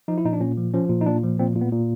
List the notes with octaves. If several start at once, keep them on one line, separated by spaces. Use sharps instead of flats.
F3 D#4
E4
A#2 D#4
D4
A#2 C#4
F3
F3 C#4
A#2
D#4
A#2 D4
F3
A#2 C4
A#2
B3
A#2